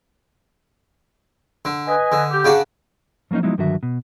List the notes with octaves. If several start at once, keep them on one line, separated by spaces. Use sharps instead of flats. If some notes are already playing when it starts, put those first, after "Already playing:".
D3
B4 D#5 G#5
D3
G4
C#3 D4 F#4
F3 F#3 A#3 C#4 D#4
F3 F#3 G#3 B3 D#4 E4
G2 D3 D#3 F#3 F#4 E5
B2